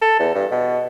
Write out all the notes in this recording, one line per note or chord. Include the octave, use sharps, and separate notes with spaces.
A4
E2
G2
B2